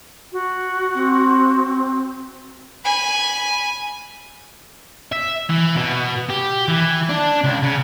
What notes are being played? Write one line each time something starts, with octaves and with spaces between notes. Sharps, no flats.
F#4
C4
G#5 B5
E5
E3
B2
G4
E3
D4
C#2
C#3